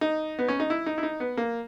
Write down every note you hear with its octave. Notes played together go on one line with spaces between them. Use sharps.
D#4
B3
C#4
D#4
E4
D#4
E4
D#4
B3
A#3